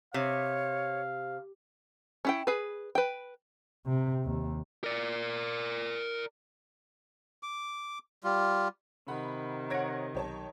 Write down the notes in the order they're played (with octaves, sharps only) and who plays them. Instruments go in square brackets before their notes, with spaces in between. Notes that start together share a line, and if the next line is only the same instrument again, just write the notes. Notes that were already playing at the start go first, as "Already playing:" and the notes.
[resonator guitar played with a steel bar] C3 [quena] C#5 [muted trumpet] F5
[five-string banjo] C#4 E4 G5
G#4 B4
B4 G5
[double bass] C3
D#2
[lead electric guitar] A#4 D5
[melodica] D6
G3 F4
[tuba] C3 [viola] D#3 [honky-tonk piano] F#5 B5
[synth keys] C#5 F#5 [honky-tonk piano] G#6 A#6 D7
[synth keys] B1 [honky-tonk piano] G4 C#5 A5